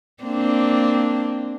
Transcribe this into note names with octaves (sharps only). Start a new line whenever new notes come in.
A#3 C4 D4